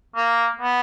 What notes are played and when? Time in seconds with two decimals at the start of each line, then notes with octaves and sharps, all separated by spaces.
0.16 A#3
0.61 B3